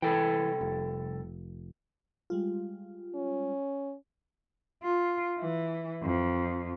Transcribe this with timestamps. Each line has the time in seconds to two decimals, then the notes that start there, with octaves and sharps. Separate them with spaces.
0.02 C2 E3 A4 G5
0.61 F1
2.30 G3 G#3 F4
3.15 C#4
4.83 F4
5.39 E3
6.03 F2